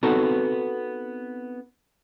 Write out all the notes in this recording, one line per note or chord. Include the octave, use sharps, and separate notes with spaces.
B3 C4 D#4 F#4 A4